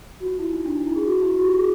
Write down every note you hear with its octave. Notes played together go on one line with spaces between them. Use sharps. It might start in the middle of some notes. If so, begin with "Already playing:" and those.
F#4
F4
E4
D#4
D4
D#4
E4
G#4
F#4
E4
F4
F#4
G4
G#4